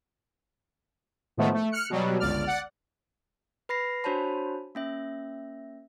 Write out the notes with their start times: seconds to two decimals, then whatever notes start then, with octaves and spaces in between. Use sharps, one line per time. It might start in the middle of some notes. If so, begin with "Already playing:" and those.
1.37 A2 D#3 F3 G#3 A3 B3
1.54 A3
1.72 F6 F#6 C#7
1.90 B2 F#3 G3
2.20 G1 C#2 D5 F6
2.45 D5 F#5
3.69 B4 B5 A#6 C7
4.04 D4 F#4 C5 C#5 A5 B5
4.75 A#3 C#4 E5